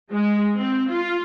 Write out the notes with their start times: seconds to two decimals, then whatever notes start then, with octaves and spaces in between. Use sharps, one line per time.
0.12 G#3
0.57 C4
0.90 F4